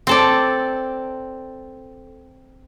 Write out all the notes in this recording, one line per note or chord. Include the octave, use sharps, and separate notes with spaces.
C4 A4 D5